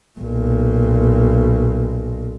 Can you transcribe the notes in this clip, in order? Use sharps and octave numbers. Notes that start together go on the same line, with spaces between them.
B1 A#2